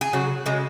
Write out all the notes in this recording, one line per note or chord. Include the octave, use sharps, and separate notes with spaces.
G#4
C#3 F#3 F#4
C#3 G#3